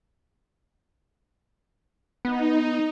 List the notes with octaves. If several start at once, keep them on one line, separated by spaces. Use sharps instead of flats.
B3 D#4